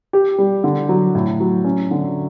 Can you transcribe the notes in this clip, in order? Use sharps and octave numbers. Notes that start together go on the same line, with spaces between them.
G4
G3
D3
F#3
A2
F#3
C#4
D3